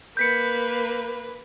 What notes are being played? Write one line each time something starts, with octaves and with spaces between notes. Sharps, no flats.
A#3 B4 G6 B6 C#7